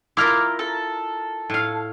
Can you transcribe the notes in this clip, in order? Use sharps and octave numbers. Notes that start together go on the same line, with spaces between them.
E4 F4 A#4 D6 F6
A4
A2 F5